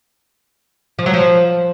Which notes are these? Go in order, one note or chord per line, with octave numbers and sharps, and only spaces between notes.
F3
F#3
F3